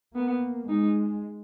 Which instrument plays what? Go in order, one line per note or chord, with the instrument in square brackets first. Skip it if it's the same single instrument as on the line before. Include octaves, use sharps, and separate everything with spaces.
[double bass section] A#3 [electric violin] B3
[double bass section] G#3 [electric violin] D#4